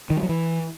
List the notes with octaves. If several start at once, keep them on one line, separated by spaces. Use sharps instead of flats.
D#3
G3
F#3
E3